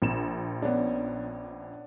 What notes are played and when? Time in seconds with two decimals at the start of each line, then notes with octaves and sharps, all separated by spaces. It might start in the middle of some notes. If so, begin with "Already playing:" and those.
0.02 A#1 E7
0.62 B3 C#4 D4